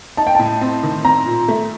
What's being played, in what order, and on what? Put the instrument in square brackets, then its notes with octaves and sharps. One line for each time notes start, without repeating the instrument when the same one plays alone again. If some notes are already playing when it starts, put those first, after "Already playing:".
[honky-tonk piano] D#4 [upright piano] A5
[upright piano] G5
[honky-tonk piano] A2 [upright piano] A5
[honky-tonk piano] C4
D#3
[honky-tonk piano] C4 [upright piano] A#5
[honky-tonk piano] A#2
A3